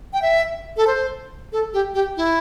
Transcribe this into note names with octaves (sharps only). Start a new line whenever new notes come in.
G5
E5
A4
C5
A4
G4
G4
E4